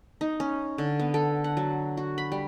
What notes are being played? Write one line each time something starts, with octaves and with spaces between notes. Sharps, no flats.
D#4
C#4
D3
B3
A4
F#5
F#3
F#4
B5
G3